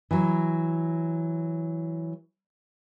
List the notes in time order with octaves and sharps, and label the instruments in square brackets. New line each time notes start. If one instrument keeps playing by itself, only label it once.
[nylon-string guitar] E3 F#3